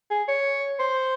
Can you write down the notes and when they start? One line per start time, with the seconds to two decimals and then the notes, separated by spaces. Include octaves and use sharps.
0.11 G#4
0.28 C#5
0.79 C5